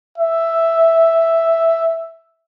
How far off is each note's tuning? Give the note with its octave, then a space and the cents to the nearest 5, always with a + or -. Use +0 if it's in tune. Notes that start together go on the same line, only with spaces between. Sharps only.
E5 +0